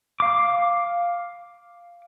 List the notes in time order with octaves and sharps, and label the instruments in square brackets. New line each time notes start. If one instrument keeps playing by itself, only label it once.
[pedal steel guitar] F5 D6